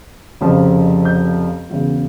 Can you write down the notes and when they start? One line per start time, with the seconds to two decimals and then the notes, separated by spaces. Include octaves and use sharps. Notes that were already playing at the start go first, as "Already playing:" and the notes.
0.41 F1 F2 C#3 F3
1.05 G6
1.70 E1 E2 C#3